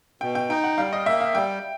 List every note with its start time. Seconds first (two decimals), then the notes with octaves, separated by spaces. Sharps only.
0.21 B2 G5
0.35 G5
0.49 D#4 G5
0.64 F#5
0.78 G3 F5
0.93 D#5
1.06 A#3 E5
1.21 F5
1.35 G3 G5